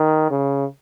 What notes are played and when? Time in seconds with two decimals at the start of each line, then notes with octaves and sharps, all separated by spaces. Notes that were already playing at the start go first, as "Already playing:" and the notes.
Already playing: D#3
0.31 C#3